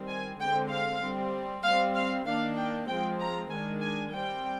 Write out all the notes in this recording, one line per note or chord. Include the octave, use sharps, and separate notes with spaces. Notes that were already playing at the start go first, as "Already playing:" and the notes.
Already playing: D#3 G3 C4
G#5
D3 G#3 C4 G5
F5
G3 C4
G3 C4 F5
F5
D#3 A#3 D4 F5
G5
F3 G#3 C4 G5
A#5
D#3 G#3 D4 G#5
G#5
G3 C4 G5